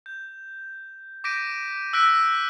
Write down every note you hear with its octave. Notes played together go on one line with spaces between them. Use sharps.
G6
D6 G6 A#6 B6 D7 D#7
E6 F#6 A#6 B6 D7